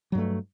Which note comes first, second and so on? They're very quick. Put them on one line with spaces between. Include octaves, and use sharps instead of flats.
F#3 G2 A3